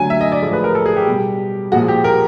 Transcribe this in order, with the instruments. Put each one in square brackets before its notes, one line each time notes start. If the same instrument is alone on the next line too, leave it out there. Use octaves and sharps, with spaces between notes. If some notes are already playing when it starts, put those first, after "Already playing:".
Already playing: [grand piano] D3 F#3 A3 G#5
E5
D#5
D5
A2 F3 G#3
B4
A#4
A4
G#4
G4
B2 G3
A#2 F3 G#3 F#4
G4
A#4